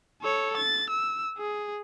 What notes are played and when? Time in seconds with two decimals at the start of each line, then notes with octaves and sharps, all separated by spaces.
0.22 A4 C#5
0.57 A6
0.90 E6
1.38 G#4